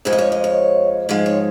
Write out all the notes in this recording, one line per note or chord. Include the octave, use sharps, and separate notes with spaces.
F2 F3 G#3 G#4
D#5
C#5
D#5
C#5
G#2 F3 G#3
C#5